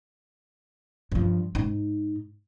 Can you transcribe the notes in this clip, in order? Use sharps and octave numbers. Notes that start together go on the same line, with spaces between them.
G2 F3
G#2 D#4